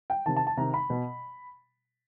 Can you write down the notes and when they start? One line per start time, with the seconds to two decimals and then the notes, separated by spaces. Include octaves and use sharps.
0.10 G5
0.26 C3 D#3 A5
0.36 A5
0.47 A5
0.57 C3 D#3 A#5
0.74 B5
0.90 B2